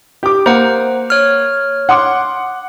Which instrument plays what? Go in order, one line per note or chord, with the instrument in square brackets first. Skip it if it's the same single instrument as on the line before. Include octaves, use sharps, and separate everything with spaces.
[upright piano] G4 D6
[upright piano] A#3 [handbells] C5 F#5
[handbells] C#5 F6
[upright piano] F#5 C6 D6